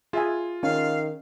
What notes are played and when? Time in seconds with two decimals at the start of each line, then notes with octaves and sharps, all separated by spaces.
0.13 F4 G#4 E5 G#5
0.63 D#3 C#4 F5